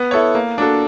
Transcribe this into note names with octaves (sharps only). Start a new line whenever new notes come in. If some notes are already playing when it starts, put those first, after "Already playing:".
Already playing: B3
E4 A4 C#5
A#3
D4 F#4 A4